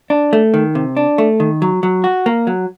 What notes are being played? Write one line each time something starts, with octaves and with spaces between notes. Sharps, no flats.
D4
A3
D#3
C3
D4
A3
D#3
F#3
F#3
F#4
A#3
F#3